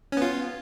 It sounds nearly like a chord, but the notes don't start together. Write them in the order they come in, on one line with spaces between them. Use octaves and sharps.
C#4 B3 F4